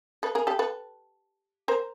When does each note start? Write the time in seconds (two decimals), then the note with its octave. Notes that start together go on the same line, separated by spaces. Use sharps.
0.23 A4 B4
0.35 G#4 A#4
0.47 G4 A4
0.59 A4 B4
1.68 A#4 C5